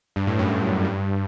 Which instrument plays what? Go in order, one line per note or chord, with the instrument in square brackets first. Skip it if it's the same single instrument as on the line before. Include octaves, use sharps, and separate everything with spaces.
[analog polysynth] G2
A2
F#2
G2